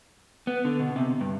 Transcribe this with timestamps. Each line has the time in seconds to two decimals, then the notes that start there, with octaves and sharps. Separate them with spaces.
0.47 B3
0.65 D3
0.80 B2
0.96 C3
1.21 G2